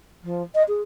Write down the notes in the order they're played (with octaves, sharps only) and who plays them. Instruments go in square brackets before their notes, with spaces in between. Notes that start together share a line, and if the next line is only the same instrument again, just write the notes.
[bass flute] F3
D#5
G#4